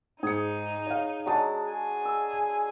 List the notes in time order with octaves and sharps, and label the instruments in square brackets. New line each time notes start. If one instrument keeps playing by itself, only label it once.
[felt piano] G#2 C#7 [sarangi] D#4 [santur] G#4
[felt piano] C#5 F5
[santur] F#3 G#3 D4 [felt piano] C#5 D5 A5
[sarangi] G#4
[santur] E6